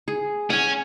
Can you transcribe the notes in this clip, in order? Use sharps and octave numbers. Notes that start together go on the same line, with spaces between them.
G#4
C#4 F#5 G#5